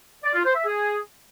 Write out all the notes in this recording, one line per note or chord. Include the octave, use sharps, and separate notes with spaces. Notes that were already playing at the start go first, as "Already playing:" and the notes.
D5
F4
C5
E5
G#4